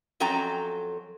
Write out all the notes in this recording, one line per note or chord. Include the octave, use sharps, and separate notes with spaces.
F2 F#3 C#4 A4 G5 A#5